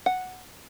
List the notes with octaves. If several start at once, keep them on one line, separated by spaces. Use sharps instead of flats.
F#5